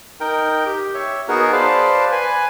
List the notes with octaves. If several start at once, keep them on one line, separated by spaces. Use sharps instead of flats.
D#4 A#4 G5
G4
C#5 E5
B3 D#4 F#4 G#4 A#4
B4 C5 D5 F5 A5
B4 G#5